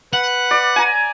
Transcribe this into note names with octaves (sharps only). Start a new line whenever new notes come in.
B4 F#5
D5
G#5 A#5